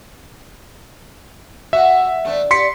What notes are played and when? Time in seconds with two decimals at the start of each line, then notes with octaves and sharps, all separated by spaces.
1.73 F#4 E5
2.25 E2 A3 D4
2.51 G4 D5 C6 B6 C#7